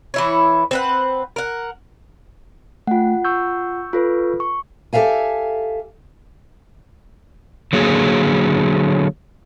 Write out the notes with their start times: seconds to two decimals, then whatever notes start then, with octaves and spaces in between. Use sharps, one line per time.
0.14 E3 E4 C#5
0.71 C4 B4 F#5
1.36 A#4 F#5
2.87 A3 F4 F#5 G5
3.24 C#6 E6 G6
3.93 F4 A4 B4
4.40 C#6
4.93 G4 A4 B4 E5 F5 G#5
7.73 D3 F#3 A#3 G#4